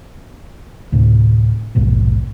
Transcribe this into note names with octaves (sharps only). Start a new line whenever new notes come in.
D2 A2 C3
A#1 D#2 G#2 B2